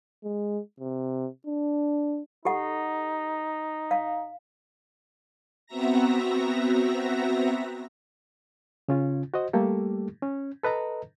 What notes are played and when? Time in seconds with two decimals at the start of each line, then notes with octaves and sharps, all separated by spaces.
0.24 G#3
0.80 C3
1.46 D4
2.45 D#4 G4 A4 F#5
3.91 F5
5.66 B3 C4 F#4 E5 A#5 A#6
8.89 C#3 C#4 F4
9.34 F#4 C5 D#5
9.53 G3 A3 A#3 G4 A4
10.22 C#4
10.63 A4 B4 D#5 A#5